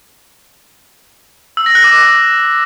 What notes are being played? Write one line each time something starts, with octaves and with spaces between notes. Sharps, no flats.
E6
A#6
F#6
D6